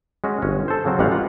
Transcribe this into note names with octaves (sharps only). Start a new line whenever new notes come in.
G#3 C#4 F#4
G1 C#4
A4 C5
C#3 F#3 C4
A1 G3 G#3 C#5 F5 F#5
F4 F#5